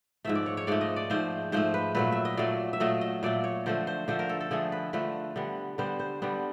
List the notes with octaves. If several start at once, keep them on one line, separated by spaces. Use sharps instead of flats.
G#2 F3 A3 E5
D5
C#5
C#5
G#2 F3 A3 D5
D#5
D5
G#2 F3 A3 C5
G#2 F3 A3 C5
B4
A#2 F#3 A3 B4
E5
D#5
A#2 F#3 A3 D5
E5
A#2 F#3 A3 D#5
D#5
A#2 F#3 A3 D5
C#5
D3 F3 A3 C5
C5
D3 F3 A3 C5
A#4
A4
A4
D3 F3 A3 G#4
B4
D3 F3 A3 B4
D3 G3 B3
D3 G3 B3 C5
C5
D3 G3 B3